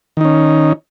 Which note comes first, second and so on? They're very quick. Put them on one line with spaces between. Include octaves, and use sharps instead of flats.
D#3 D#4 C#4